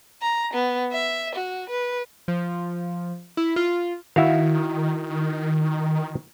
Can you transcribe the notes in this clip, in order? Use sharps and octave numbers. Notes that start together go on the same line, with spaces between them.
A#5
B3
E5
F#4
B4
F3
E4
F4
D#3 E4 F#4 F5